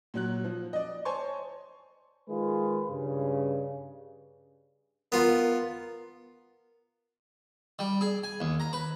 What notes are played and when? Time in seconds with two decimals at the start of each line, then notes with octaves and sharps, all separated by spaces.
0.14 A#2 F#3 F#6
0.44 F3
0.73 D5 D#5
1.05 C5 C#5 G#5 A5 C6 C#6
2.29 D#3 G#3 F4 G#4 B4
2.90 G2 C#3
5.12 B3 F4 A#4
7.79 G3
8.01 G#4
8.24 G#5
8.40 D#2
8.60 A#5
8.73 B4